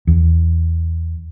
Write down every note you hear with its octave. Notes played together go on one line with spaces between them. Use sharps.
E2